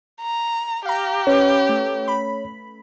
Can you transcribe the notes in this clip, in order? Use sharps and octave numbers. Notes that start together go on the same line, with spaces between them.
A#5
G4 F5 A#5
C#4 B4 C#5
A3
B5